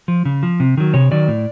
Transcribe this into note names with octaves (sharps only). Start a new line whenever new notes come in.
F3
C#3
F3
C3
D#3 F#3
C3 C#5
D#3 F#3 D5
A2